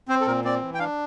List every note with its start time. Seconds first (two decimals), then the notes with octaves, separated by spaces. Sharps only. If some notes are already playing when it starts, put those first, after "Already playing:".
0.08 C4 C5
0.21 A4
0.26 A#2 A#4
0.44 C4 D5
0.61 E3
0.74 G5
0.79 D4 F5